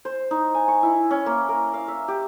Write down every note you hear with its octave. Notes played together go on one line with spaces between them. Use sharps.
C5
D#4
G#5
C#6
E4
C#4
A#3
A#4
F5
E5
G4